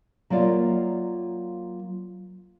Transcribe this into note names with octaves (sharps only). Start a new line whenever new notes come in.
F#3 A#3 F4 D5 E5